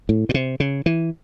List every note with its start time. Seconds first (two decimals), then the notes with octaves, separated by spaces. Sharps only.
0.09 A2
0.29 A2
0.34 C3
0.60 C#3
0.86 E3